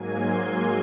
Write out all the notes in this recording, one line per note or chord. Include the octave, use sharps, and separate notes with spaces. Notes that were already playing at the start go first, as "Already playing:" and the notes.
Already playing: G#2 F#3 A#3 G#5
C6
C6